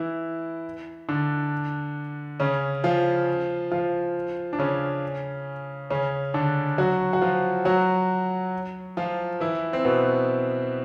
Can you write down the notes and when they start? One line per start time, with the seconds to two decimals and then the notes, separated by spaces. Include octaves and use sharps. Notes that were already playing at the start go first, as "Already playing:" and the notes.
Already playing: E3 E4
1.09 D3 D4
2.40 C#3 C#4
2.84 F3 F4
3.71 F3 F4
4.53 D4
4.59 C#3 C#4
5.90 C#3 C#4
6.34 D3 D4
6.78 F#3 F#4
7.13 F#4
7.21 F3 F4
7.65 F#3 F#4
8.97 F3 F4
9.40 E3 E4
9.73 C4
9.85 B2 B3